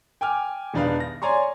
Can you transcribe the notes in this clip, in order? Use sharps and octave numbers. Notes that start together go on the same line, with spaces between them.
G5 G#5 D6 F6
E1 D#3 D4 D#4 B4 F5
A#6
C#5 D5 G#5 A#5 C6 C#6